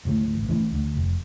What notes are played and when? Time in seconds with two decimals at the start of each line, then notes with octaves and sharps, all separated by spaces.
0.05 D2 G#2 A3
0.34 A1
0.49 E3 A3 C#4
0.71 D2
0.95 F1